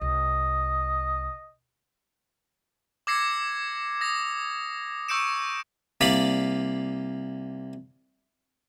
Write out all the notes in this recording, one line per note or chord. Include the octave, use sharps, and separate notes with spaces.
C2 D#5
D6 E6 G#6 A#6 C7 C#7
D#6 A#6
C#6 E6 G6 C#7 D7 E7
C2 A#3 D5 F5 B5 D#6